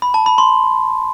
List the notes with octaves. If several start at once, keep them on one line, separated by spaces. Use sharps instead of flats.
B5
A5
B5
C6